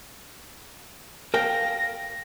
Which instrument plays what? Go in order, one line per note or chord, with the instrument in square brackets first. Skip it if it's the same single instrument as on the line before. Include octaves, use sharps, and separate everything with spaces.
[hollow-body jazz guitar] A#4 F5 G5 [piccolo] A#6